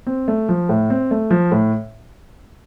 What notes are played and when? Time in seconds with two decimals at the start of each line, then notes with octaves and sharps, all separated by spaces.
0.07 C4
0.28 A3
0.49 F3
0.69 A2
0.90 C4
1.11 A3
1.31 F3
1.52 A2